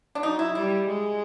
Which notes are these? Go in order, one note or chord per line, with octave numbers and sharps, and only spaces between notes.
D4
F#3 D#4
E4
G3 E4
G#3